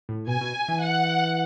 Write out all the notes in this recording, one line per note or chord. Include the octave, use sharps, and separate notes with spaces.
A2
B2 G#5
B2
E3
F#5